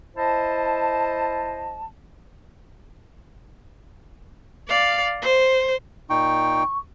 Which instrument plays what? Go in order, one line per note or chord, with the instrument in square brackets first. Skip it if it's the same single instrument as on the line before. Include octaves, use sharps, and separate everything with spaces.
[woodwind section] E4 C5 D#5 A5
[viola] D5 F5
C5
[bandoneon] A#2 D#4 G5 [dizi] C#6